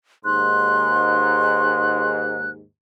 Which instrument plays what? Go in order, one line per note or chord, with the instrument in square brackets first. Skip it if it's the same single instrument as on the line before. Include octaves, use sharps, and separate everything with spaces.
[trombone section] D#2 G#2 [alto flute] C6 [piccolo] F#6